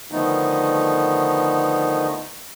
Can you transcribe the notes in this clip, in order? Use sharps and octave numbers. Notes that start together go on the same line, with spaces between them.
D3 D#3 F3 A3 B3 D#4